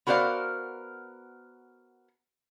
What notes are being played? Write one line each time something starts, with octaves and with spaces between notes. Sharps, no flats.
B3 F#4 A#4 C5 D5 F5